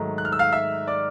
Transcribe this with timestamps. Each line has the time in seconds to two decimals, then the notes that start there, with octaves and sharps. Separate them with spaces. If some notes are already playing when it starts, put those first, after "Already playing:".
Already playing: G#2 D#3 F#3 A3
0.18 F#6
0.25 F6
0.32 E6
0.39 F5 F6
0.53 E5 E6
0.87 D5 D6